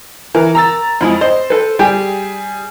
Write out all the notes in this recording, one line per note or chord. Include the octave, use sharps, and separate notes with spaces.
E3 A#4
A#5 E6 A6
F2 G#3 E4 F4
C5 D#5
A4 B4
G3 G4 G#4